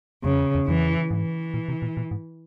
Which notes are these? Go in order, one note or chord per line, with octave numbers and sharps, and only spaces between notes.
F2 C#3
E2
E2
F2 E3
E2
F2
G#2 E3
A#2
C3
A#2
A#2
G#2